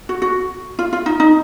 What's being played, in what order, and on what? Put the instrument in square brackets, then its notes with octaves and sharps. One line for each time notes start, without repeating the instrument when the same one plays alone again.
[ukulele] F#4
F#4
F4
F4
D#4
D#4